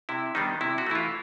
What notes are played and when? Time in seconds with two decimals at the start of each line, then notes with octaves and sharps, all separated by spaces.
0.09 C3 E4
0.35 D#3 G3 B3 D4 D#4
0.61 C3 E4
0.78 F#4
0.86 E3 A3 E4
0.95 F4